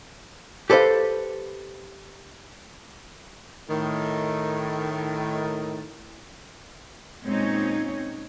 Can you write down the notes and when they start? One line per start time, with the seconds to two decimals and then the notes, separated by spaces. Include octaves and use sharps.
0.70 G4 A4 B4 C5 F5
3.69 A2 D#3
7.23 A#2 G#3 C4 C#4 D#4 C#5